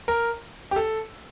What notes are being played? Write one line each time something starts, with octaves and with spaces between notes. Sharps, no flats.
A#4
G4
A4